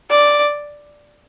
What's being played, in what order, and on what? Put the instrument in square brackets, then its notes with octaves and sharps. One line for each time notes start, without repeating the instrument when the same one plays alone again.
[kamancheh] D5